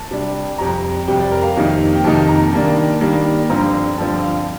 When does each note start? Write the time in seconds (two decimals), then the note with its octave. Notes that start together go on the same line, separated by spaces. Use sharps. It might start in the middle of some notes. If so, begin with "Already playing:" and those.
Already playing: A5
0.11 C3 G3 D4
0.58 F2 C3 G3 A#5
1.07 F2 C3 G3 G5
1.20 D5
1.32 A#4
1.43 F5
1.56 F2 C3 D#3 A#3 D#4
1.95 G5
2.04 F2 C3 D#3 A#3 D#4 A5
2.29 A#5
2.52 D#3 G3 A#3 D4 A5
3.01 D#3 G3 A#3 D4
3.49 G2 D3 F3 C4 A#5
3.98 G2 D3 F3 C4 A5
4.22 F5